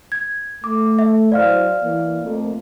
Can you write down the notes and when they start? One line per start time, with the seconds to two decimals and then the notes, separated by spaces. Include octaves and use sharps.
0.12 G#6
0.64 A3 D6
0.99 E5
1.32 E3 F#3 C5 D5 F5 F6
1.83 E3 A#3
2.23 F2 A3 A#3